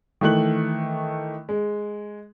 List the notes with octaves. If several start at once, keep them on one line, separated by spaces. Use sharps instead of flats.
D#3 E3 A3 F#6 F#7
G#3